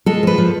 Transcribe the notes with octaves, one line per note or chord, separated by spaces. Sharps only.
G#3 A4
F3 B4
F3